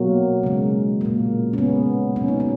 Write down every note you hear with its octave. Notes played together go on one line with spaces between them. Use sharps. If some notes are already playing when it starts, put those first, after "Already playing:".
Already playing: B2 F#3 A#3
C#3 G#3
A#2 F3 A#3
C#4
C#3 G#3 B3
B2 F#3 A#3 C#4
D#4
C#4